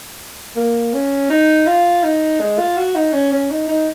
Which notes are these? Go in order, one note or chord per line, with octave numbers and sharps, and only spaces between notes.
A#3
C#4
D#4
F4
D#4
G#3
F4
F#4
D#4
C#4
C#4
D#4
D#4